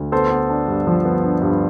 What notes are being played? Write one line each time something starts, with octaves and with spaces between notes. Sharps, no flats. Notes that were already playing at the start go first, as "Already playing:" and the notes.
Already playing: D2
B3 A4 C5
B3
D4
G2
F3
B3
D4
G2